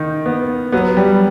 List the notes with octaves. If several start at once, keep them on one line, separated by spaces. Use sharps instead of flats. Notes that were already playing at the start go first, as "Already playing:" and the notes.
Already playing: D#3
B3
F#3 B3
G3